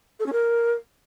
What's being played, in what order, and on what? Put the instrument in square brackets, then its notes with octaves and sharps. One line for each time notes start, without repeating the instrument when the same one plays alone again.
[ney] A4
C#4
A#4